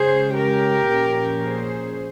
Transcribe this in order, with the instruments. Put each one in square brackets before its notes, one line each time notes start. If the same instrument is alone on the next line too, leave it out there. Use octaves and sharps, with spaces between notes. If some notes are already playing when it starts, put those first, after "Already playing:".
Already playing: [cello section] C#3 G#3 C#4 G#4 C5
G4 A#4
A#2 F3 A#3 C#4
G#4 C5